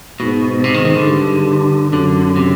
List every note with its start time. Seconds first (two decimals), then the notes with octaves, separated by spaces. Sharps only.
0.20 G#2 B2
0.64 C3
0.74 D#3
0.85 D#3
0.96 D3
1.06 G2
1.92 F#2 D3
2.36 C3